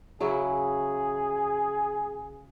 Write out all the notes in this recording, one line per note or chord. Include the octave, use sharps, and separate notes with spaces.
C#3 F#3 E4 G#4